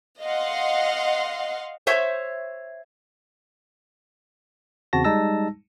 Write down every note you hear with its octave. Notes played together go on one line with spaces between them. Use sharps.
D#5 F5 F#5 C6
C5 C#5 E5
E2 C#3 C4 F#4 A5 A#6
G3 G#3 D#4 A5 E6 A#6